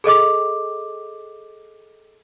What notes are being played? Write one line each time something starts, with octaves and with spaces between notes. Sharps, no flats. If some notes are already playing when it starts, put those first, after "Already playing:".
G#4 A4 D#5 D6